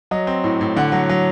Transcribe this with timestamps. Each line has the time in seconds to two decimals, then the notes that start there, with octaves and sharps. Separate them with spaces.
0.11 F#3 D#5
0.27 C4
0.44 A2
0.61 A2
0.76 D3 F#5
0.92 F#3
1.09 F#3